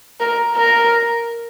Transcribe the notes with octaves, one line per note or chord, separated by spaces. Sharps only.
A#4
A#4